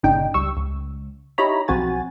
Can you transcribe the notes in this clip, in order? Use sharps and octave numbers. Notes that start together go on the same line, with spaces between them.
G1 A#2 C#3 D4 D#4 G5
C#2 G3 C#6 E6
C#2
D#4 E4 G4 C#5 A#5 B5
B1 F3 C4 F#4 G#5 A6